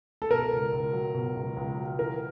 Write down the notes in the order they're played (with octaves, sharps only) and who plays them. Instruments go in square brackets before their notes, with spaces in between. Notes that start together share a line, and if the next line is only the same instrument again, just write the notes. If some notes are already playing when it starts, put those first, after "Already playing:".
[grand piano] A4
[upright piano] B2 [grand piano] A#4
[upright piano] C#2
C#2
F#3
B2
C#2
C#2
F#3
[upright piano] E3 [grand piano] A#4